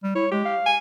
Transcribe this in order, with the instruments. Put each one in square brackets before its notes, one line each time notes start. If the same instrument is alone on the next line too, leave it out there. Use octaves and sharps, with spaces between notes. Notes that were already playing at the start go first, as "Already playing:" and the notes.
[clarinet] G3
[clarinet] E4 [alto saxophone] C#5
[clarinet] G#3 [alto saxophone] G4
[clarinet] F5
[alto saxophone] G#5